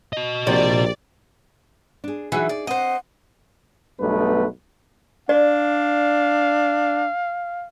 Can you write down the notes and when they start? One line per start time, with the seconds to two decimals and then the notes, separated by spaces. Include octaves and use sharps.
0.13 F#4 D#5
0.47 A#1 C3 D5
2.04 D4 G#4
2.32 E3 F#3 D#4 G#4
2.49 D5
2.67 C4 C5 D#5 F#5
4.00 B1 G2 A3 B3 B4
5.29 D4 D5 F5